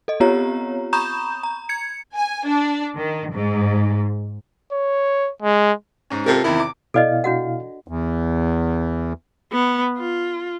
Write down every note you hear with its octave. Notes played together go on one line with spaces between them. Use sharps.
A4 D#5
B3 C4 F4 G4 C#5 A#5
A#5 B5 C#6 D#6 G6 E7
A#5
G#6 C#7
G#5
D4
D#3
G#2
C#5
G#3
G#2 C#4
C3 F4 A4 A#4
E2 C3 D#3 E4
D6
B2 E4 A4 D5 D#5 F5
D4 F#4 F#5
E2
B3
F4